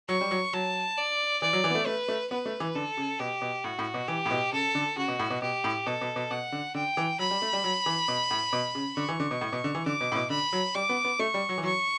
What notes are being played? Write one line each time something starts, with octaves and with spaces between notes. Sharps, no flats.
F#3 C#6
G3
F#3
F#3 A5
D5
E3 D5
F#3
E3
B3
A3
A3 B4
A3
B3 B4
A3
E3
D3 A4
C#3
B2 G4
B2
A2 F#4
A2
B2
E3 G4
A2
B2
C#3 A4
D3
C#3 F#4
B2
A2
B2
B2 G4
A2
B2 A4
B2
B2
B2 F#5
D3
D3 G5
E3
F#3 B5
G3
A3
G3
F#3
E3
B2
A2
B2
C#3
D3 C#6
E3
D3
B2
A2
B2
D3
E3
D3 D6
B2
A2
B2
D3 B5
F#3
G3 D6
B3
B3
A3 C#6
G3
F#3
E3
F#3 C#6